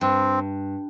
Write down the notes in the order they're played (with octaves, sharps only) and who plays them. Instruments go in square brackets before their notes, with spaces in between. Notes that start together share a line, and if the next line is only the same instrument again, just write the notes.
[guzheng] G2 [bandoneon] C4